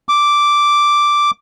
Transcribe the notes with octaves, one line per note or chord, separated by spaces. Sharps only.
D6